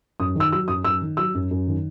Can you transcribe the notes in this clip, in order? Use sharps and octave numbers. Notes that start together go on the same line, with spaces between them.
F#2 D#6
D#3 E6
F#3 E6
F#2 D#6
F#2 E6
D#3
F#3 E6
F#2
F#2
D#3